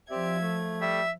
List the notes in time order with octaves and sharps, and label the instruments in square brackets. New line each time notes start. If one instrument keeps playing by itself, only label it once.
[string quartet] F3 G#6 [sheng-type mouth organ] C4 G4 D5 [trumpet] E5
[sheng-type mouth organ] A3
[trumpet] G3 [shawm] E5